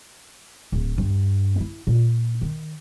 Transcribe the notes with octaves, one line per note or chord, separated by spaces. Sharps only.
D1
G2
E4
A#2
D#3